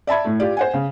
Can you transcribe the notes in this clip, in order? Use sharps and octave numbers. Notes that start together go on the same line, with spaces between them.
D5 E5 A5 B5 G#6
A2 A3
F4 G4 D5
C5 F#5 G#5
C#3